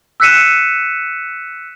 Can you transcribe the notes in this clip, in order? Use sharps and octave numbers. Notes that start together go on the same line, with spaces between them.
E6 F#6 B6 C#7 D#7 E7